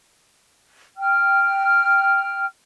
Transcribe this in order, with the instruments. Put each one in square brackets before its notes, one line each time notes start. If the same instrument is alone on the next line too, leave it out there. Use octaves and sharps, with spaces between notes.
[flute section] G5 F6